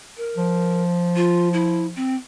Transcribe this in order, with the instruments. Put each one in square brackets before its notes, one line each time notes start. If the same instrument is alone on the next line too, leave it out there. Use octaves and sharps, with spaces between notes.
[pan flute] A#4
[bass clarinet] F3
[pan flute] F4
E4
C4